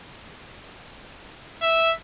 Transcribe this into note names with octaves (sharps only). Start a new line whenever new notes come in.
E5